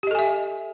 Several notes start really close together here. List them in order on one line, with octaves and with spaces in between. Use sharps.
G4 D#5 A4 G#5 E5